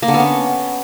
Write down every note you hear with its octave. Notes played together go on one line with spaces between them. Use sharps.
A#3
D3
B3
C#4